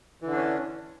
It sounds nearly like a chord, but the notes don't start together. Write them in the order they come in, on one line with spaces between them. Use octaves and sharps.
E3 D3 D4 C#4